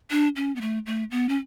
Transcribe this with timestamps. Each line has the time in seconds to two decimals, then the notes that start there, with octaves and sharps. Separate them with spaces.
0.11 D4
0.36 C#4
0.56 B3
0.61 A3
0.86 A3
1.11 B3
1.29 C#4